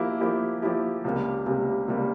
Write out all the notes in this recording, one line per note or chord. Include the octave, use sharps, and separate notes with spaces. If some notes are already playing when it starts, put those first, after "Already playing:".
Already playing: F3 A#3 E4 G4
F3 A#3 E4 G4
F3 A#3 E4 G4
C#2 C3 G3 A#3
C#2 C3 G3 A#3
C#2 C3 G3 A#3